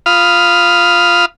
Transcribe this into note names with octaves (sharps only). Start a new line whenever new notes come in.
F4 F5 B5 D#6 F6